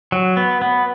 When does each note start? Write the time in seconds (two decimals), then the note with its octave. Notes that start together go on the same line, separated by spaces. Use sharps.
0.12 F#3
0.37 B3
0.62 B3